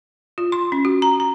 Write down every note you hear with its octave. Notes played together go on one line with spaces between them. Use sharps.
F4
C6
C#4
F#4
A#5
A#5